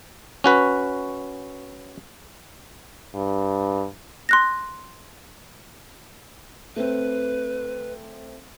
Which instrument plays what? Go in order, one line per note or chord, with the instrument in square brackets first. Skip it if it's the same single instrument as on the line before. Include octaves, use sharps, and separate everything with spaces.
[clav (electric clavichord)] C#4 F#4 B4
[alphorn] G2
[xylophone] C6 F#6 A#6
[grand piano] A3 C4 [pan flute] B4